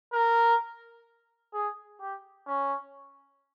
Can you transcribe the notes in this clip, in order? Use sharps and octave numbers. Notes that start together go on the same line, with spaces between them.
A#4
G#4
G4
C#4